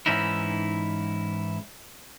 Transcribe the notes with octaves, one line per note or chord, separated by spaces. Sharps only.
G#2 E3 C#4 D#4 E4